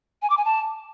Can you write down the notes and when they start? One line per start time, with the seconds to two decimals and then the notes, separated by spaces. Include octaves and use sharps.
0.22 G#5
0.30 D6
0.37 G#5
0.45 A5